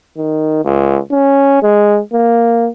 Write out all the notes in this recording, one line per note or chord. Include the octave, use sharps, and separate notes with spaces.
D#3
C#2
C#4
G#3
A#3